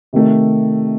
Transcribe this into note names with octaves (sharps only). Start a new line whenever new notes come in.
C3 D#3 A3 D#4